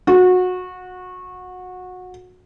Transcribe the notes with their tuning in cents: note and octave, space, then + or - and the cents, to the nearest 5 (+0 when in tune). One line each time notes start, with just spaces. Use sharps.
F#4 -20